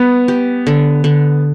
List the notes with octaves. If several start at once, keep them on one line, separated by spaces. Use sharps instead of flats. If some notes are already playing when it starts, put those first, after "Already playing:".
Already playing: G3 B3 B4
G4
D3
D3